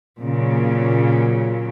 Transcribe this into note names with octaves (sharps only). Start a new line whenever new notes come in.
A#2 C#3 F#3